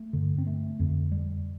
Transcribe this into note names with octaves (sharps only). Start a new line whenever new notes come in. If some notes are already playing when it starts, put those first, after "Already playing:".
Already playing: A3
G2 D3
C4
A3
F2 D3
G3